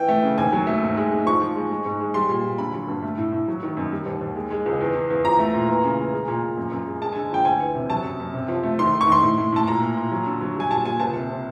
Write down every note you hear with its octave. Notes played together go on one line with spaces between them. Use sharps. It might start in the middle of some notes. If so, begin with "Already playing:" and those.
Already playing: E3 G5
A3
C#3
D#2 G#5
F#3
A3
G#2
G#3
G#2
F3 C#6
F3
G#3
G#3
G#2
G#3
G3 C6
A#2
A#2
D3 B5
F#3
G2
A3
A2
A2
F#3
D#3
F#2
G3
D#2
D#2
G#3
G#3
C#2
E2
E2
E2
F3 A#5
A3
A#2
E3
C#3
E3
G#3
A#2
A#2
F#2
F#2
G#3
G#3 A5
D3 G#5
F3 G5
D2 G#5
E3
C3
F#3 A5
F#2
F#2
C3
F3
A3
D#3 C6
D#3
C#6
D#3 C6
A2
A2
A2 A5
A#2 A#5
A#2
A#2
F#3
D3
F#3
G3 G#5
A#2 A5
A#2 G#5
C#2 A5
C3
C3